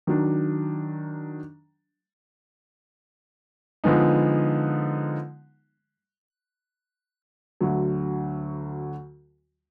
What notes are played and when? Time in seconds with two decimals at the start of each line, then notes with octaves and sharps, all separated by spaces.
0.07 D#3 F#3 D4
3.84 D3 F3 G#3 B3 D#4
7.61 D2 D3 F#3